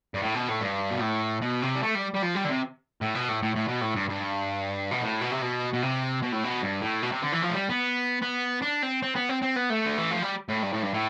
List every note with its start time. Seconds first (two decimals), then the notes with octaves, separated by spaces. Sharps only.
0.14 G2
0.22 A2
0.35 B2
0.49 A2
0.61 G2
0.91 B2
1.01 A2
1.42 B2
1.62 C3
1.75 G3
1.82 A3
1.95 G3
2.14 G3
2.22 F3
2.35 G3
2.44 D3
2.49 C3
3.01 A2
3.15 B2
3.29 A2
3.43 A2
3.56 A2
3.68 B2
3.81 A2
3.96 G2
4.09 G2
4.91 B2
5.02 A2
5.21 B2
5.32 C3
5.42 B2
5.73 B2
5.83 C3
6.22 B2
6.32 A2
6.44 B2
6.62 G2
6.82 A2
7.03 B2
7.12 C3
7.23 D3
7.33 E3
7.43 F3
7.50 A3
7.55 G3
7.70 B3
8.22 B3
8.62 D4
8.83 C4
9.03 C4
9.15 B3
9.29 C4
9.42 C4
9.56 B3
9.70 A3
9.86 D3
9.97 E3
10.11 F3
10.22 G3
10.49 A2
10.63 G2
10.72 A2
10.83 G2
10.93 A2